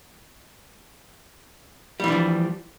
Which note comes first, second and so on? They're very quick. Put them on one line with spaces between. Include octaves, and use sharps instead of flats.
G3 E3 D4 F3